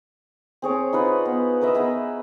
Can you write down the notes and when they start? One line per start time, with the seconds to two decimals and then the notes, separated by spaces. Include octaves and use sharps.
0.62 C4 G#4 C#5 D6
0.93 D#4 F4 B4
1.25 B3
1.61 A#4 B4 D#5 E5
1.75 B3 D#4 G#4 E5